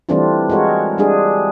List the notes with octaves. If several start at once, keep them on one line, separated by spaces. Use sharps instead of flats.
E3 G3 A3 C4 D4 F4
G#3 F4 F#4 A#4 C#5
G3 G#3 D4 G#4